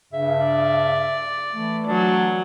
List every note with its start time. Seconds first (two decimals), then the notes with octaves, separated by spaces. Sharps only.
0.13 G2 C#3 E5
0.45 D5
1.54 E3 A3
1.88 F#3 D4